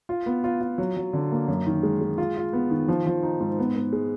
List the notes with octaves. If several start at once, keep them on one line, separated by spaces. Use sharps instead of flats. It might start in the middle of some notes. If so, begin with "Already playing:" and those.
F4
B3
F4
F4
F#3
F#3
D3
A#3
F#2
D#3
G#3
G#3
F4
F4
B3
D#3
F3
F3
D#4
G#2
B3
B3
G#3